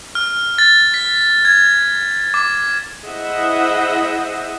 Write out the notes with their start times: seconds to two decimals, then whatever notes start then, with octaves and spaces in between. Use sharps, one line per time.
0.15 F6
0.58 A6
0.94 B6
1.45 G#6
2.34 D6
3.05 E4 G#4 C5 D#5 E5 F#5